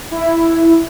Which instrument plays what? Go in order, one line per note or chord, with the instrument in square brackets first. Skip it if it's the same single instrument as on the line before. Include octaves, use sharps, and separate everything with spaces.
[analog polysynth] E4